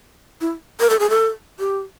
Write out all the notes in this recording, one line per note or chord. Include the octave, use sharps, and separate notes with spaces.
E4
A#4
A4
G#4
A4
G4